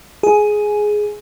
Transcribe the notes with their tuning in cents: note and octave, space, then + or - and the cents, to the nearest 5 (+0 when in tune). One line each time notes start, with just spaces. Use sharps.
G#4 +10